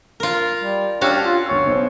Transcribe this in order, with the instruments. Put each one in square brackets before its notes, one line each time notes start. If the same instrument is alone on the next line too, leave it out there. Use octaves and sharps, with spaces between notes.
[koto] F4 A#4
[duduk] G3
[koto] C#4 F#4 F5 [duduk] D4 [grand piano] G4 G5 E6
[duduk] F4
[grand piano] G1 C#6 E6 [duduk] C#5
[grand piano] B1 B2 C5